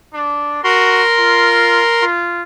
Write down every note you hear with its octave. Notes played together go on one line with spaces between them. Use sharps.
D4
F#4 A#4 C6
F4
F4